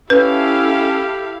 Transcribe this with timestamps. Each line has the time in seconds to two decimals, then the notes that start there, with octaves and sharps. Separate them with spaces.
0.10 C#4 E4 G4 A4 B4 F5